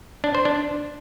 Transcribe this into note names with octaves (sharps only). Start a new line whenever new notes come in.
D4
C5
D4